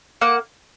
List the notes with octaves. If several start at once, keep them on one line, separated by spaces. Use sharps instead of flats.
A#3 F#5